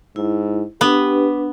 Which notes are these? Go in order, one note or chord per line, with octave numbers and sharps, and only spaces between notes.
G#2 E4
B3 D4 G4 B4